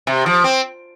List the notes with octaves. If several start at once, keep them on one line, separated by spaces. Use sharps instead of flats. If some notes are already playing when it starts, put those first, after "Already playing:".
C3
F3
C4